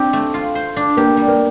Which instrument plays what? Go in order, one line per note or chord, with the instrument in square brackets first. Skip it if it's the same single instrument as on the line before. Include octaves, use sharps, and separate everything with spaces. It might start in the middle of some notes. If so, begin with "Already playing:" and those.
Already playing: [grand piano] C4 [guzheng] D4 G4
[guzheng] A3
F4
C5
D4
[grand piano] A#3 [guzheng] G4
[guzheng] G3
[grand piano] A#3